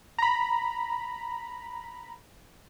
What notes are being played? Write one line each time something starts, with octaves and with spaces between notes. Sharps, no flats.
A#5 B5